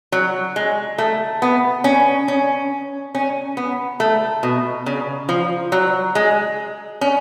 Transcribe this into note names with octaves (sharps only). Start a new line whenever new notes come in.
F#3
G#3
A3
B3
C#4
C#4
C#4
B3
A3
B2
C#3
F3
F#3
G#3
C#4